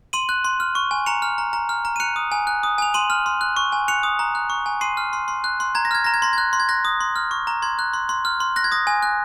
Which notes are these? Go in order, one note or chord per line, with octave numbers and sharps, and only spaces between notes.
C6 D#7 F#7
F#6
C6
F6
C#6
G#5
A#5 C#7 F7
F6
A#5
A#5
F6
A#5
D#7
F#6 C#7 F7
D#6
G#5
F#6
D#6
G#5 F7
C6 D#7 F#7
F6
C6
F#6
C#6
G#5
F#6 C#7 F7
D#6
A#5
F#6
C#6
G#5
C6 C7 D#7
F6
C6
C6
F#6
C6
A#5 G#6
A#6
F6 G#6
A#5 A#6
G#6
C6 A#6
F#6 G#6
C6
G#6
F#6 A#6
D#6
C6
F6
C#6
A#5
C6 G#6
F#6
C6
C6
F6
C6
F#6 A#6
G#6
D#6 A#6
G#5
F#6